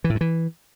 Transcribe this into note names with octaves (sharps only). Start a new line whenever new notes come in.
E3
A2
G2
E3